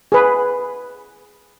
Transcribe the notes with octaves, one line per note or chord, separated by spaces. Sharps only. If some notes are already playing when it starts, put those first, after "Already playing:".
G#4 B4